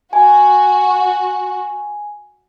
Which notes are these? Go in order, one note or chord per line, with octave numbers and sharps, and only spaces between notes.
F#4 G#5